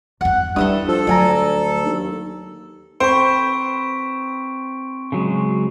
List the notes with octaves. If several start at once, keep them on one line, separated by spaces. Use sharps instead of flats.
E2 G2 F#5
G2 G3 E4 A4 E5 D#6
F3 A4
D2 F#3 D5 G#5 A#5
D#2
C4 B4 C5 C#6 D7
C#3 F#3 G#3